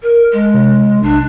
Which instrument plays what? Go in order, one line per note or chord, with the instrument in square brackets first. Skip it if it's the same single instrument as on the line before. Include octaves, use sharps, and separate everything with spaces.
[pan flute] A#4
G#3
[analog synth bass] C3
[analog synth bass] B1 [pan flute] D4